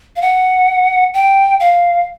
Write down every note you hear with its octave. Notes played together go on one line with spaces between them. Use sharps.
F5
F#5
G5
F5